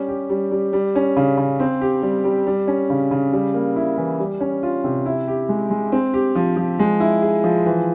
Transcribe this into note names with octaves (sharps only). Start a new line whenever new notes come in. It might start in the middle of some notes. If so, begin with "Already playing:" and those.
Already playing: G3 C#4
G4
G3
G3
G3
C#4
C#3
C#3
C4
G4
G3
G3
G3
C#4
C#3
C#3
G3
A#3
E4
E3
G3
C#4
F4
C3
E4
G4
G#3
G#3
C4
G4
F3
F3
G#3
E4
G#4
F3
E3